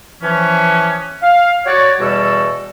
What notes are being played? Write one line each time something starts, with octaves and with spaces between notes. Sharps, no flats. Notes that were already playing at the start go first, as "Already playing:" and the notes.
E3 F3 C#4
F5
F#4 C#5 D5
E2 B2 G3 F#4 A4 E6